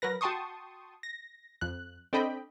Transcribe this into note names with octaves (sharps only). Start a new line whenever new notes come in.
F#3 A#4 B4 A#6
F#4 G5 A5 C6 C#6 D#6
A#6
F2 F#6
C4 D4 A4 D#5 G5 B5